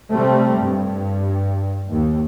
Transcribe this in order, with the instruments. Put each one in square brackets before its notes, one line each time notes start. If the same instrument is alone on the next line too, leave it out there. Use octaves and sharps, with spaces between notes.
[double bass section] C3 G3 A3 C4
G2
D#2